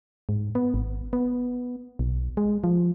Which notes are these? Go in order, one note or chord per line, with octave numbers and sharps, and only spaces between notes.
G#2
B3
G#1
B3
B1
G#3
F3